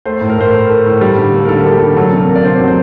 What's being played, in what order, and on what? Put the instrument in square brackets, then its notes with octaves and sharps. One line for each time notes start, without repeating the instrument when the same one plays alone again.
[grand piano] A3 C5
A2
A#4
A2 C5
A3 A#4
A3
A2
G3
D3
A#3
A#4
D3 A4
G3
G4
D3
F#3 A4
C3
A#4
A#3
D5
C3 C5
F#3
C5